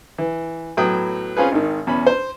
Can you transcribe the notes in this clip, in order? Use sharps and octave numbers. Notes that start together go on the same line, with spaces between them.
E3
A2 F#3 B3 G5 D#6
C4 C#4 F4 G#4 B4
G#1 D#3
E2 C#4 B5
C5